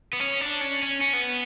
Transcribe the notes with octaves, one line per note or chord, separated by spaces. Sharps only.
B3
C#4
D4
C#4
C#4
C#4
B3